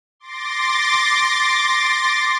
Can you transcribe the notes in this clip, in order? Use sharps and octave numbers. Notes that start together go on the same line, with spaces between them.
C6 D6 A6 A#6